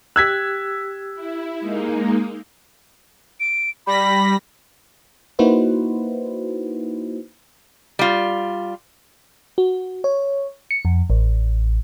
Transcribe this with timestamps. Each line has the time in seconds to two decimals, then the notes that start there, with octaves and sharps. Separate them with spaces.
0.16 G4 E6 F#6 G#6 B6
1.15 E4
1.61 G#3 A#3 D#4
3.40 D7
3.87 G3 B5 A#6 B6
5.39 A#3 D#4 E4 F#4 B4 C5
7.99 G3 F4
9.58 F#4
10.04 C#5
10.71 C#7
10.85 F2
11.10 A1